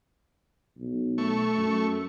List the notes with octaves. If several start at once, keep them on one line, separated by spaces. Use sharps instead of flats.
B1
A3 C#6
F#2